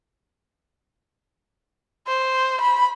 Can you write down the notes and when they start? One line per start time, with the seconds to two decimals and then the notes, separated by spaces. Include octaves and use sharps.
2.08 C5
2.61 B5